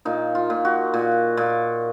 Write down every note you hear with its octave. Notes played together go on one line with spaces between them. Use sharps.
A#2 D#4
F4
A#2
F#4
A#2
A#2